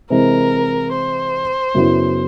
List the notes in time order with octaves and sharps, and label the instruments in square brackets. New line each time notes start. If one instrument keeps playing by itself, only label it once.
[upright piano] C3 E3 G#3 C4 [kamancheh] A#4
[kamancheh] C5
[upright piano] F#2 C#3 F#3 B3 E4